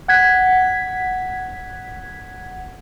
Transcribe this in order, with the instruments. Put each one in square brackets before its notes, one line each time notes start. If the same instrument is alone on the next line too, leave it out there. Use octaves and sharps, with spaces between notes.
[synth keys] F#5 G#6 B6